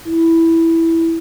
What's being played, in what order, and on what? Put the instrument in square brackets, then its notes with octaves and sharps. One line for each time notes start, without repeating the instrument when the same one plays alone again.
[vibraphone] E4